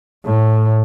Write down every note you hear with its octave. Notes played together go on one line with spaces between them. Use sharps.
A2